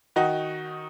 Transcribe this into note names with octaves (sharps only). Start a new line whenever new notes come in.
D#3 D#4 F#4